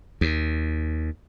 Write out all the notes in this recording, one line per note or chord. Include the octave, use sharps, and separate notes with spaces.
D#2